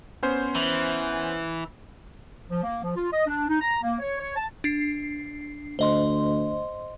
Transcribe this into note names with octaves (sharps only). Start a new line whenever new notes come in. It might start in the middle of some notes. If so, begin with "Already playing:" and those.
B3 C#4 C5
E3
F3
A#3
F3
F4
D#5
D4
D#4
A#5
A#3
C#5
C#5
A5
D4 C7
D2 C5 D#5 C6